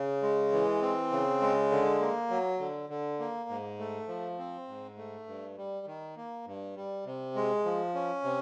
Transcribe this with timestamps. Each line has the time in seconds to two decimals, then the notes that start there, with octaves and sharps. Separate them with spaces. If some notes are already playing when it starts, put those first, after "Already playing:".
Already playing: C#3
0.22 G#3
0.52 E3
0.82 C4
1.11 C#3
1.41 G#3
1.71 D3
2.01 A#3
2.30 F#3
2.60 D3
2.90 D3
3.19 A#3
3.49 G#2
3.79 A3
4.08 F3
4.38 C4
4.68 G#2
4.97 A3
5.27 G2
5.57 G3
5.86 D#3
6.17 A#3
6.46 G2
6.76 G3
7.06 C3
7.35 G#3
7.65 F3
7.95 C#4
8.24 C3